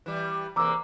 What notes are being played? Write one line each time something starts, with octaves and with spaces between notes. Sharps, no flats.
E3 G3
E2 C3 A#3 A#5 D6 E6